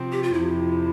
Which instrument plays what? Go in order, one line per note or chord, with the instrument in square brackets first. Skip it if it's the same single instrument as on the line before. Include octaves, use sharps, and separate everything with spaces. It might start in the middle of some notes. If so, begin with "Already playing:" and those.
Already playing: [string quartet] C3 F3 C4
[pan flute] G4
F4
[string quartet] F2 C3 F3 [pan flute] E4